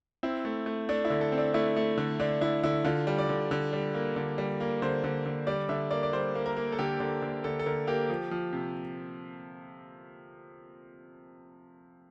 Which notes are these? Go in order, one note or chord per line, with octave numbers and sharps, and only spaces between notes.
C4 E4
A3
A3
A3 D4
E4
D3
A4
C4
D4
A3 E4
A3
D3
D3 D4
D3 E4
D3 E4
D3 F4
G3
D5
D3
D3
G3
A#3
D3
G3
A#3
D3 C5
D3
D3
G3 D5
D3 E5
A#3 D5
D5
G3 C5
A#3
A#4
A#3
A4
D3 G4
D3
D3
D3 A4
A4
D3 A#4
A#3 G4
F3
F3
C3